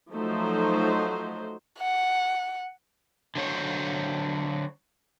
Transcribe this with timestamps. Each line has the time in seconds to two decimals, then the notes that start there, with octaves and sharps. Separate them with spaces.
0.12 F3 F#3 A3 D#4 F#4 C5
1.79 F#5
3.35 D3 F#3 C5 C#5